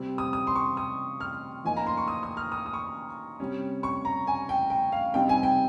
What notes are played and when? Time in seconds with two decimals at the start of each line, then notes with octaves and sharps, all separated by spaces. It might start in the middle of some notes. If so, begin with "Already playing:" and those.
Already playing: C3 G3 C4
0.18 D#6
0.33 D#6
0.47 C6
0.55 C#6
0.77 D#6
1.20 F6
1.64 F3 A#3 D#4 G#5
1.77 A#5
1.87 C6
1.97 C#6
2.08 D#6
2.23 D#6
2.37 F6
2.52 D#6
2.66 D#6
2.73 C#6
3.40 C3 G3 C#4
3.83 C#6
4.05 A#5
4.27 G#5
4.49 G5
4.70 G5
4.92 F5
5.14 C3 G3 C4 D#4 G5
5.29 G#5
5.43 G5